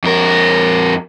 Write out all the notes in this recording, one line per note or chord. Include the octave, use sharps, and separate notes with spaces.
F2 A#4